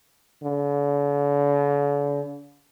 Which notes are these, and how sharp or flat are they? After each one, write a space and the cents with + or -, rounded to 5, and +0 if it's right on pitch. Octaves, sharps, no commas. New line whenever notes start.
D3 -45